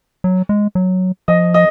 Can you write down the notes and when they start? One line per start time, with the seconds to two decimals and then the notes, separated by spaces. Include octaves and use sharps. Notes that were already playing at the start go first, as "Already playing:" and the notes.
0.24 F#3
0.49 G#3
0.75 F#3
1.28 F3 D#5
1.54 D#5